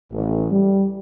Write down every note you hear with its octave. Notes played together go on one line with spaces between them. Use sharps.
A1
G3